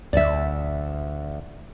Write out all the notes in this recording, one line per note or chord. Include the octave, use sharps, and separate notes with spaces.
D2 D5 E5